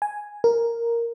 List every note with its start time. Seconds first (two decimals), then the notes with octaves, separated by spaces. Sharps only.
0.02 G#5
0.44 A#4